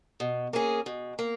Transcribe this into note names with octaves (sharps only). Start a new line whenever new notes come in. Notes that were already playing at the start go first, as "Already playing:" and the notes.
B2
A#3 C#4 G#4
B2
A#3